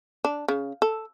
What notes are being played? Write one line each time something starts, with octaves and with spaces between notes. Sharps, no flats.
D4
C#3
A4